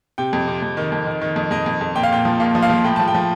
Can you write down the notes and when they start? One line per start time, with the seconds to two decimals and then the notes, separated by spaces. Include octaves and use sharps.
0.18 C3 G5
0.33 F2
0.47 C3
0.62 F2
0.77 D#3
0.92 F2
1.06 D#3
1.21 D#3
1.36 F2
1.51 F2 D#5
1.66 F2
1.81 F2
1.95 A#2 G5
2.03 F5
2.11 A#2 G5
2.25 F3
2.40 A#2 F5
2.55 F3
2.62 F5
2.70 F3
2.84 A2 G5
2.96 F3 A5
3.08 G5
3.14 F3